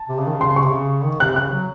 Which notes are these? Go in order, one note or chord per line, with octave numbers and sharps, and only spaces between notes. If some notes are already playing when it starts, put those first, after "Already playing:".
Already playing: A5
C3
C#3
D#3
C#3
C6
C#6
C3
C#3
D#3
C3 F#6
C#3 F#6
F#3